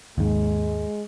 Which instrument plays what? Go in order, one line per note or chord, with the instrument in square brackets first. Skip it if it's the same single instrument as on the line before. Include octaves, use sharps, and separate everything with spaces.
[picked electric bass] D#2 G#2 [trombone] G#3